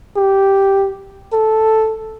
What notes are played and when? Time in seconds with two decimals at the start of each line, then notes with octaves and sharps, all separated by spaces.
0.17 G4
1.33 A4